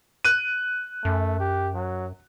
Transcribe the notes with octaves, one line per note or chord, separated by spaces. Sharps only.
F#6 D#7
F#2 A3
G4
F#3